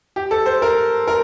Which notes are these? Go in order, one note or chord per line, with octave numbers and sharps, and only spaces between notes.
G4
A4
C5
A#4
A#4